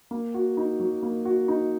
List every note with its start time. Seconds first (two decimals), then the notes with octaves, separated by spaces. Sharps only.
0.11 A#3
0.34 F#4
0.57 D#4
0.80 F#3
1.03 A#3
1.25 F#4
1.48 D#4